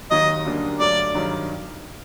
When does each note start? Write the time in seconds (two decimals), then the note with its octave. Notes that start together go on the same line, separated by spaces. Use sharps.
0.10 D#2 D#3 F#3 D#5
0.45 F#2 D3 G3 A#3 D4
0.80 G2 D3 F#3 A3 D5
1.15 G2 D#3 F#3